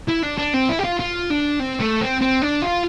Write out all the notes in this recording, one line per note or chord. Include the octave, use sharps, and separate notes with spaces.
E4
D4
D4
C4
E4
G4
F4
F4
D4
C4
A3
C4
C4
D4
F4